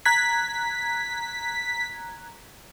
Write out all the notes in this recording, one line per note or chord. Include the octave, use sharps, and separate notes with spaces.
A#5 F#6 G#6 B6